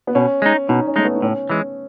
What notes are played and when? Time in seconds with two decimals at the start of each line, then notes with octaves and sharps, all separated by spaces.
0.07 B3
0.15 B2 C#4
0.42 G#3 D#4
0.69 B2 D#4
0.87 C#4
0.96 G#3 A3 D#4
1.04 B3
1.16 D#4
1.22 A2 C#4
1.50 E3 G#3